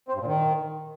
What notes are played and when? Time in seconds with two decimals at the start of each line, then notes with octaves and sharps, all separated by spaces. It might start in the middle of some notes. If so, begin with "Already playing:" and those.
0.08 C4
0.15 G2
0.21 A#2
0.27 D#3